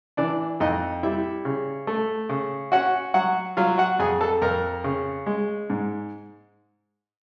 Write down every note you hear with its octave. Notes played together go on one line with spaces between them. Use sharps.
E3 D4 D5
F2 D#4 D#5
G3 E4 E5
C#3
A3
C#3
C#4 F#4 F#5
F#3 F#4 F#5
F#3 F4 F5
F#4 F#5
F2 G#4 G#5
A4 A5
F2 A#4 A#5
C#3
G#3
G#2